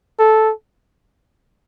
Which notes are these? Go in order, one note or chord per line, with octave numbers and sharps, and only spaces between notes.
A4